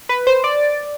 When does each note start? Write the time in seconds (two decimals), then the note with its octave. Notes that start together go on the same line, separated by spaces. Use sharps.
0.09 B4
0.27 C5
0.44 D5